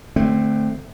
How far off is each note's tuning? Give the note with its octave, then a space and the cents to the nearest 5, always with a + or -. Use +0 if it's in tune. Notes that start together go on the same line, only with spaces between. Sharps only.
D3 +25 A3 +0 C4 +0